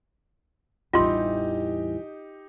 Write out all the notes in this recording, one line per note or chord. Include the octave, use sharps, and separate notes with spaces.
A1 E2 E3 G3 D#4 F4 G4 C6